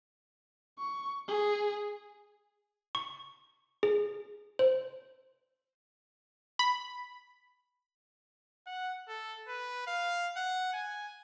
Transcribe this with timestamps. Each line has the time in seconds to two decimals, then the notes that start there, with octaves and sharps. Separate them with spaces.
0.79 C#6
1.28 G#4
2.95 C#6
3.83 G#4
4.59 C5
6.59 B5
8.67 F#5
9.08 A4
9.48 B4
9.87 F5
10.36 F#5
10.73 G#5